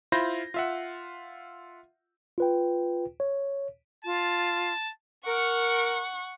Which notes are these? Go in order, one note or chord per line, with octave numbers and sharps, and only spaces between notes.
E4 F4 C5 B5 G6 A#6
F4 E5 F#5
F4 B4 G5
C#5
F4 A5
A#4 F#5 C#6